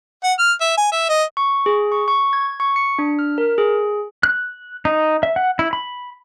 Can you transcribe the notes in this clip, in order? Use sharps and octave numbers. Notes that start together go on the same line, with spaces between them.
F#5
F6
E5
G#5
E5
D#5
C#6
G#4
C#6
C#6
G#6
C#6
C#7
D4
F6
A#4
G#4
F#6
D#4
E5
F#5
E4
B5